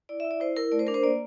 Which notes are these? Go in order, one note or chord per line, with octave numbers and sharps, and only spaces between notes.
E4 D5
E5
E4
D5
E4 C5
E4 A#4
A3 D5
C5
D4 A#4
C5
A#3 D5